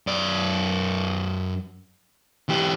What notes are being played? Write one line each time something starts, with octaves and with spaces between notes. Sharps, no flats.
F#2 D5
E3 G4